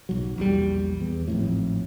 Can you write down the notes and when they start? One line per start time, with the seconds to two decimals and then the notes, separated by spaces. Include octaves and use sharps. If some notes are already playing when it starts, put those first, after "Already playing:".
0.09 B1 F#3
0.38 A#1 E2 E3 G3
1.00 E2
1.28 G#1 F2 A2